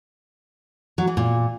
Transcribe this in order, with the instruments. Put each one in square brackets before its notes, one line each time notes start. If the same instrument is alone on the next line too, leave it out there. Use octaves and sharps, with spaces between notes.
[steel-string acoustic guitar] F#3
E3
A#2